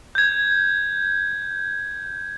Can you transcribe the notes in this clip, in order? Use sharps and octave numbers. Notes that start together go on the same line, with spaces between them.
G6 G#6